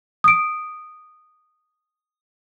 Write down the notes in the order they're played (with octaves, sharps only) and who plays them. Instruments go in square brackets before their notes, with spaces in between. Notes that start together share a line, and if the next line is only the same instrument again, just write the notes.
[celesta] D#6 D7